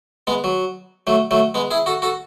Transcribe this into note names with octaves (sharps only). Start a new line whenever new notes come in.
G#3 B3
F#3
F#3 A3
F#3 A3
G#3 B3
E4 G#4
F#4 A4
F#4 A4